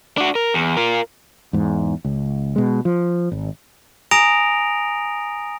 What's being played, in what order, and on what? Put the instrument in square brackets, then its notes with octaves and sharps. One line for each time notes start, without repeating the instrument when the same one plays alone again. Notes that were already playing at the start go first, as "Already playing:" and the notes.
[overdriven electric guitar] D4 F#4
A#4
E2
F4 A#4
[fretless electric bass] E2 G#2
C#2
B2 G#3
F3
G#1
[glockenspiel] G#5 A#5 D#6 A#6 D7 F7